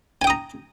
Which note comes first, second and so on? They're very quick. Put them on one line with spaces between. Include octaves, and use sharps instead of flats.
G#5 G5 D#6 A#5